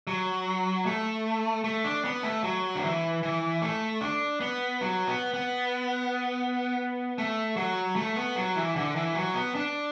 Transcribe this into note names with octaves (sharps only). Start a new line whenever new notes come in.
F#3
A3
A3
D4
B3
A3
F#3
D3
E3
E3
A3
D4
B3
F#3
B3
B3
A3
F#3
A3
B3
F#3
E3
D3
E3
F#3
B3
D4